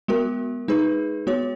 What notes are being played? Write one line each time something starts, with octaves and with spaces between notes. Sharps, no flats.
G#3 B3 F#4 A#4
G#3 D#4 G#4 B4
G#3 B3 F#4 C#5